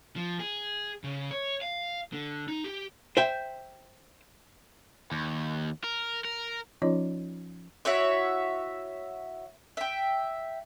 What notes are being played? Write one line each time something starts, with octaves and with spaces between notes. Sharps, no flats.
F3
G#4
C#3
C#5
F5
D3
D#4
G4
C5 E5 G5
D#2
A#4
A#4
F3 C#4 D#4 F4 C#5 D#5
E4 F#4 C#5 E5
E5 G5